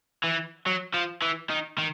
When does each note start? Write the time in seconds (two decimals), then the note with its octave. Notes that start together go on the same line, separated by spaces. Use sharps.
0.24 E3
0.66 F#3
0.94 F3
1.22 E3
1.50 D#3
1.78 D#3